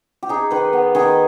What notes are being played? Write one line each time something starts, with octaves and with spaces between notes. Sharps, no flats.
G4
D#4 G#4
D#3 B4
B3
D#3 G#4